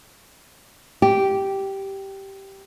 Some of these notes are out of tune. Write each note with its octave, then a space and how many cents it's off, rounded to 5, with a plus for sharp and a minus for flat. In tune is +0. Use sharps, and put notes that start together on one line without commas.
G4 -10